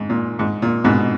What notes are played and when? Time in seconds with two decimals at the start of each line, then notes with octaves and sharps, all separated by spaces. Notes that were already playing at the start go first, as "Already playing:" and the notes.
Already playing: G#2
0.10 A#2
0.39 G#2
0.62 A#2
0.84 G#2 B2